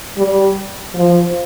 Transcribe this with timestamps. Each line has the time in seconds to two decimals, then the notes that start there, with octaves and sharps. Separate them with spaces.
0.18 G3
0.95 F3